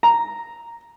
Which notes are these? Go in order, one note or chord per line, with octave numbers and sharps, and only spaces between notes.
A#5